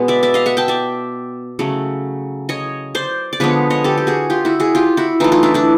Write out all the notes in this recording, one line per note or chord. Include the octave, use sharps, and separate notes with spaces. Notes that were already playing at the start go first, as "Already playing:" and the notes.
Already playing: B2 G#3 B3
D5 E5
D5 E5
D#5 F5
E5 F#5
G5 A5
D5 E5
C#3 F#3 A3
C#5 D#5
C5 D5
D5
D3 F3 G#3 B3 B4 C#5
C#5 D#5
G4 A4
G4
F#4 G#4
F4 G4
E4 F#4
F#4 G#4
F4 G4
E4 F#4
E3 A3 D#4 F4
D#4 F4
D4 E4
D4 E4